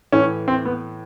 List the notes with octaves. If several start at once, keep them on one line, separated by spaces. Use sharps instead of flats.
A2 E3 C#4
C4
B3